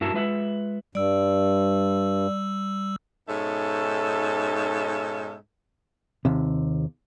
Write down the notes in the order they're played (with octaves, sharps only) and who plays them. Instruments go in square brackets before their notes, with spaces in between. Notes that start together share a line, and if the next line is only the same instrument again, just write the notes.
[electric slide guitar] G2 E4 F#4 A#4 E5 A5
G#3 F4 B4 E5 F#5
[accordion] G2 [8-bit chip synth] G3 E6 [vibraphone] D5
[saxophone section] G#2 B2 C#4 D#4 A4 E5
[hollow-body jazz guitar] D#2 C3